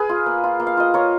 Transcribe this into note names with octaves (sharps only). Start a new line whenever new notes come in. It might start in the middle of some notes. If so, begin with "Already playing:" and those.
Already playing: G#4 B4
F4
A#3
F4
A#3
F5
F4 D#5
F4 A#4 C#5